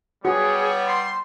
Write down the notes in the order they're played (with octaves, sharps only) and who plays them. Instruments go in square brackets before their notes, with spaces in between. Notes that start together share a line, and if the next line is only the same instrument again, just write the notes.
[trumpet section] G3 B3 [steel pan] F#4 [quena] G#4 [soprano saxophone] C#5
[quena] C6